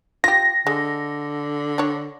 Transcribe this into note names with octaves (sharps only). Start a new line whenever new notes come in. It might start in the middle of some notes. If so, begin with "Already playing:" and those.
F4 G4 A#6
D3 G#3
D4 C#5